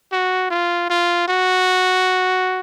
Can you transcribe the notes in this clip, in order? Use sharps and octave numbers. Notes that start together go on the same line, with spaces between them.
F#4
F4
F4
F#4